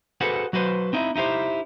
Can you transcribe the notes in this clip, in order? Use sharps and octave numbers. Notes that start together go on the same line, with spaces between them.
F#4 G#4 A4 B4 C5 F#5
F#3 F#4 B4 C5
C4 D#4 E4
D#4 E4 G4 C5